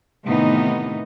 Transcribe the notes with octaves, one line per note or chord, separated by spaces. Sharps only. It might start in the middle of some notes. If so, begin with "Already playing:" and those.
A2 C3 D#3 E3 B3 D#4